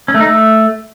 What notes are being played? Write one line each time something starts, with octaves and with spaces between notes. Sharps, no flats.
C#4
A3
D#4
A3